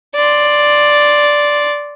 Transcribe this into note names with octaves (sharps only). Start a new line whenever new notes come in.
D5 C6